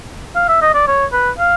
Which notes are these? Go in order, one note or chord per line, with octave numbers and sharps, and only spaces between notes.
F5
E5
D#5
D5
C#5
B4
F5